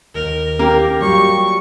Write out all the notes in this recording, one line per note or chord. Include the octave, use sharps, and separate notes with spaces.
D#2 A#4
A#3 G4
F#3 G3 F4 C#6